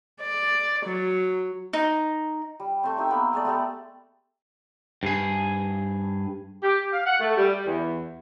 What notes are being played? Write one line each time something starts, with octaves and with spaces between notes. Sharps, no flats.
D5
F#3
D#4
G3
A3 C4
D#4 G4 E5 E6
A#3 B3 A#4
G#3 A3 D5
A3 B3 G4 A4
G2 G#4
G4
F5
F#5
A3
G3
E2